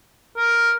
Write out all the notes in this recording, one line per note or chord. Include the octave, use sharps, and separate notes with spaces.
A#4